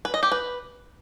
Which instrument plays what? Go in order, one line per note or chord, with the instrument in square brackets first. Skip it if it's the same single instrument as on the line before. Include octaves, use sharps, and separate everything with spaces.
[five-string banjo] B4
D#5
G4
B4